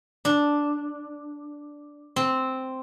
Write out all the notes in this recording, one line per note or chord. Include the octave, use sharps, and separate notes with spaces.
D4
C4